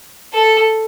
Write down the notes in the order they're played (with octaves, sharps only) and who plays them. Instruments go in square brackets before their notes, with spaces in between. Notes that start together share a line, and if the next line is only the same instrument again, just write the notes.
[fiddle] A4